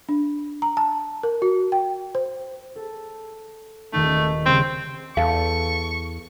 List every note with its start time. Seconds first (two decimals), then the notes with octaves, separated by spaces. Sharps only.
0.09 D4
0.62 A#5
0.77 A5
1.23 A#4
1.42 F#4
1.72 G5
2.15 C5
2.76 A4
3.93 D#1 D#3 A3 D#4
4.46 C#3 G3 C4
5.17 E2 A4 F5 C#6